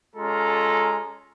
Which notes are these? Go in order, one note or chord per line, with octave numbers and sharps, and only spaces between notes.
G#3 C#4 F4 A4 A#5